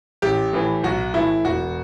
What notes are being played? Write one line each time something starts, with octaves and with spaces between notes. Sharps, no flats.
A1 G4
A2 E3
B1 F#4
A2 E3 A3 E4
E1 F#4